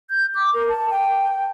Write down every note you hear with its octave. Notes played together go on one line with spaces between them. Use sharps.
G6
D6
A#4
A5
G5